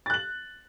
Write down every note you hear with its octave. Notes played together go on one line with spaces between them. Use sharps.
F#6 A6 F#7